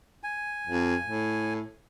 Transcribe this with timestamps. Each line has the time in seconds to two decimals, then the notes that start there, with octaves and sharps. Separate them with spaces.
0.23 G#5
0.67 F2
1.05 A2